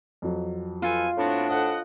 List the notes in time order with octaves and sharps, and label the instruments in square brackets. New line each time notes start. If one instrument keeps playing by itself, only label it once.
[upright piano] F2 F#3
[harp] F4 [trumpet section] A4 B4 G#5
[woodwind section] A2 D4 [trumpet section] B3 C4 F#4
[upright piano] A4 C5 [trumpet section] D#5 F#5